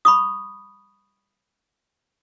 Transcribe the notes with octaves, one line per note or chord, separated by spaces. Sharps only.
B5 C#6 D#6